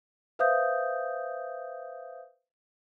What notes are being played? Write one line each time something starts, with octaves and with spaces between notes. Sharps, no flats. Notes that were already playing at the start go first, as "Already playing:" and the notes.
B4 C5 E5 F5 D#6 G6